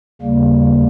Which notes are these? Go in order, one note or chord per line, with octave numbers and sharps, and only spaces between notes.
D#2 C#3 G3 A#3